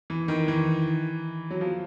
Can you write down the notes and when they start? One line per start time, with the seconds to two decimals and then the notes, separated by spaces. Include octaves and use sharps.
0.10 E3
0.28 D#3
0.48 E3
1.50 F#3
1.61 F3